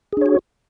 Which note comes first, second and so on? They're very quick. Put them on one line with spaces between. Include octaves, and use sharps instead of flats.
G#4 D4 C#5 F#4